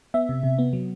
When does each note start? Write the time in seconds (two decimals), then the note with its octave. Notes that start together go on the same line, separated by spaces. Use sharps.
0.14 B3 E5
0.29 C3
0.43 C3
0.58 B3
0.73 F#3